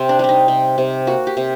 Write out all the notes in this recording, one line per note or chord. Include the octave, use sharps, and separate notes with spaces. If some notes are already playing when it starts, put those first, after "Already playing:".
Already playing: C3 C4
D4
G3 D4
D#4
C3
C3
A#3 F#4
G4
C3